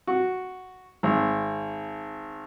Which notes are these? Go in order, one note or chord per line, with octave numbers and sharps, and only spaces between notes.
F#4
G#1